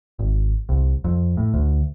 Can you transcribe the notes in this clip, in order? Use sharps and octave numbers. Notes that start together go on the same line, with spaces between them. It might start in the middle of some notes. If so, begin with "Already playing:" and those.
G#1
C2
F2
A2
D2